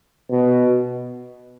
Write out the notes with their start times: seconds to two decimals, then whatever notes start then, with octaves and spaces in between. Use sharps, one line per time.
0.31 B2